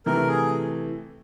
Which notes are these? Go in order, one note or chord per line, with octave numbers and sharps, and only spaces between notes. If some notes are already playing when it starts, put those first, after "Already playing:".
C3 E3 A3 A#4
G#4